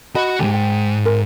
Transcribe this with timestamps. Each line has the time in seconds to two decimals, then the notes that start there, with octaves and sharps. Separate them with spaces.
0.15 F#4 D#5 F#5 B5
0.39 D2 G#2 G4 G#5
0.54 G5
1.05 A#4